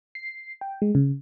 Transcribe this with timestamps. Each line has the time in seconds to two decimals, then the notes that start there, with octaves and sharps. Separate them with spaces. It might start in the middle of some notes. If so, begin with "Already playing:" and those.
0.15 C7
0.61 G5
0.82 G#3
0.95 C#3